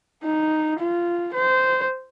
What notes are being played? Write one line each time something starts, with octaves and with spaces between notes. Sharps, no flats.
D#4
F4
C5